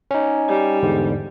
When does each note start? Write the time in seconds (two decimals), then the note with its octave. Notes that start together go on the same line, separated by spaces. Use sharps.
0.11 C#4 D#4
0.49 G3
0.83 E2 G#2 D3